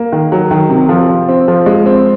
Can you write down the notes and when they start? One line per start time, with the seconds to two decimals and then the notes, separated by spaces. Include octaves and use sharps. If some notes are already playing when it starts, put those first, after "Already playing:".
Already playing: A#3
0.12 D#3
0.32 F#3
0.51 D#3
0.70 C3
0.89 F3
1.08 F3
1.29 C4
1.48 F3
1.66 G#3
1.86 C4